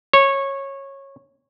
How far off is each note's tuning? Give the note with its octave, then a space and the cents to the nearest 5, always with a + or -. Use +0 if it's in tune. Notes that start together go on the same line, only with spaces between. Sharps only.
C#5 -15